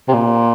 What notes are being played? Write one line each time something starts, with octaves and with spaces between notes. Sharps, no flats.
C3
A#2